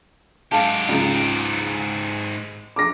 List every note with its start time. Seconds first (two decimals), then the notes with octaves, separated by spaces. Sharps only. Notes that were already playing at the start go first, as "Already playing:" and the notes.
0.52 G#2 G4 F5 A5
0.89 C#2 C#3
2.76 D6 A#6